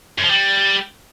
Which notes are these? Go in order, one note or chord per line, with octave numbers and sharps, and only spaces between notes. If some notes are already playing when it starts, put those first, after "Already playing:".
F#2
F3
G3